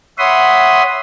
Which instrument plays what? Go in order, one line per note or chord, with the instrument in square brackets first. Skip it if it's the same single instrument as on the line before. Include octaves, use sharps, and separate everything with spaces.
[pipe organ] C#5 E5 F#5 B5 C6 D#6